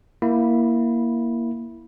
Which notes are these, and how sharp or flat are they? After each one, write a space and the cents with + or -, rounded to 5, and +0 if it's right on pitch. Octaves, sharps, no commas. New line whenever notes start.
A#3 +10 E4 +5 B5 -10